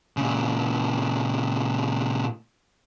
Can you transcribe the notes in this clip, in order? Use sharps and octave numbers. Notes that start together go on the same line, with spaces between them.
A#2 C#3